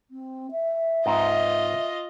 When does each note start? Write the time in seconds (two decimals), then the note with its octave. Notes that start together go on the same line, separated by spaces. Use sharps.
0.11 C4
0.51 E5
1.06 G#2 C4 F4 B4 D#5